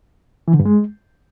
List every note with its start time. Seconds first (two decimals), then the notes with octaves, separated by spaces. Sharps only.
0.48 E3
0.54 D3
0.59 G2
0.65 G#3